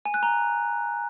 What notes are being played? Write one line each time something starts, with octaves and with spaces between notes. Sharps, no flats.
G#5
F#6
A#5